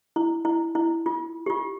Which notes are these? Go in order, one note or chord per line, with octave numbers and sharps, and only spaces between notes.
E4
E4
E4
F4
G4
F4